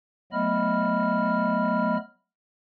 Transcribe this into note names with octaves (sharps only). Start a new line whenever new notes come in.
F#3 A3 B3 D#5 B5 F6